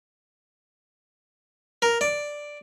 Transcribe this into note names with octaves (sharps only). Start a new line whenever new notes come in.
A#4
D5